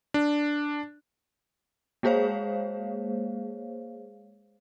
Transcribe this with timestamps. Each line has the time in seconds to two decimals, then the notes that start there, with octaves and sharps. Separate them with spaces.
0.14 D4
2.03 G#3 A#3 G#4 C5 C#5 F5